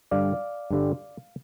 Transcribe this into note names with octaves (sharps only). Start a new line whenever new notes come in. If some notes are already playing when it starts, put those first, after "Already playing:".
G2 D3 G3 D5 F5
G2 D3 G3